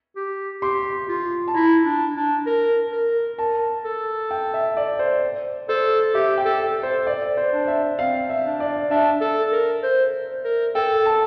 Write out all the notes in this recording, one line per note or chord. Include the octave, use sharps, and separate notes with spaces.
G4
G4 C6
F4
A5
E4 A#5
D4
D4
A#4
A#4
A#4 A5
A4
G5
E5
D5
C5
A4 C5
G4 E5
G5
A4
A4
C5
D5
C5
D4
E5
C4 F5
E5
D4
D5
D4 E5
A4
A#4
C5
A#4
A4 G5
A5